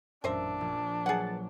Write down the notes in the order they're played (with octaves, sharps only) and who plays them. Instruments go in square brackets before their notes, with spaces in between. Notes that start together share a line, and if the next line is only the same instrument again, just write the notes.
[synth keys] A1 F#2 [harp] A#2 [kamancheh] D4 [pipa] A#4 C5 E5
[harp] A#1
[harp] F#3 [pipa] G#4 F#5 [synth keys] B4 A6